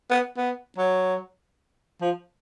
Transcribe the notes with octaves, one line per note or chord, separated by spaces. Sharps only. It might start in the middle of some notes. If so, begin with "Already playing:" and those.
B3
B3
F#3
F3